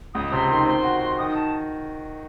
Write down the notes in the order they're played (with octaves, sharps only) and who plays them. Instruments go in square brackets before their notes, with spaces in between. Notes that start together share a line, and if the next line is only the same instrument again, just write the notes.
[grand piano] C#2 [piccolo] D#6
[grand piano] C3 [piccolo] C6
[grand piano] D#3 [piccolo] C6
[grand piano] C4 [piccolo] C6
[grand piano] F#4
F#4
[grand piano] D#3 [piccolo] D#6
[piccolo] A5